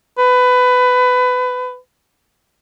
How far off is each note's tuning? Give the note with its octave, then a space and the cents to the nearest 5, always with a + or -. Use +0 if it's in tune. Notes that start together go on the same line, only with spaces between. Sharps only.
B4 +20